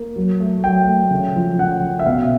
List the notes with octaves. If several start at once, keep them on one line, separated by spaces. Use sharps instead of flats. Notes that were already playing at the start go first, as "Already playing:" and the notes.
Already playing: A#3
F#3
A3
F#3 G5
A3
C#3
F3
C#3 F#5
C#3
E5
B2 F5